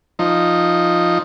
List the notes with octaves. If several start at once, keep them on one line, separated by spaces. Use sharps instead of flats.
F3 D#4